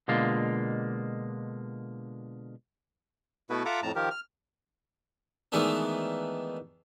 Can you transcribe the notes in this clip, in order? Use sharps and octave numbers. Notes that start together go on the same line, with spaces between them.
B2 D3 G#3 A#3 F4
B2 A3 B3 E4 F#4 B4
F4 A4 E5 F#5 A#5 D6
F2 A2 A5 A#5
D#3 F3 G4 A#4
F6
D#3 E3 G#3 A3 B3 D4